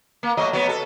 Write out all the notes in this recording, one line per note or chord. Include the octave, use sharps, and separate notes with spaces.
A#3
F#3 A3 D#5
F#3 B3
A4